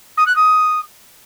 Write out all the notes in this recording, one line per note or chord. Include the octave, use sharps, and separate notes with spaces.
D#6
F#6
D#6